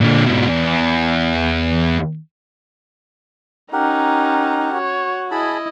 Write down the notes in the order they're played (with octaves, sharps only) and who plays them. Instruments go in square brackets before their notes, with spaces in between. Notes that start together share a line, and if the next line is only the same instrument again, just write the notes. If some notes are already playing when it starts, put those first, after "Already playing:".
[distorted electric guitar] A#2 D3
G#2 B2
E2
[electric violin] C#4 A#5 [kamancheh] D#4 [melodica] G4 A#4 F#5
[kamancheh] F#4 [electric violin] C#5
[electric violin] E4 D#5 [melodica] G#4 A5 B5